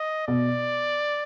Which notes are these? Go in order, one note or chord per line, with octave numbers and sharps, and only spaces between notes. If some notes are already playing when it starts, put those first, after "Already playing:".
Already playing: D#5
B2 D5